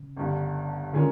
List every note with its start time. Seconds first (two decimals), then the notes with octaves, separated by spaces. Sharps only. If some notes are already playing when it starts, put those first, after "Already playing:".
Already playing: C#3
0.17 G1 G2 D3
0.93 D3 D#3 G#3 C#4 F4 A#4